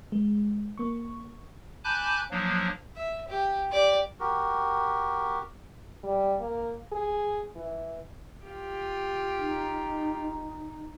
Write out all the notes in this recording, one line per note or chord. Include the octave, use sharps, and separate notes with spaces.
G#3
A#3 C#6
G#5 A5 B5 D6 F#6 G6
F3 F#3 A#3 D4
E5
G4
G4 D5
F#4 G4 A#4
G3
A#3
G#4
E3
F4 G4
D#4